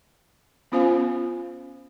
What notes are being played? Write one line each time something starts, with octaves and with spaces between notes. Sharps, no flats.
B3 C#4 F4 C5 F5 G#5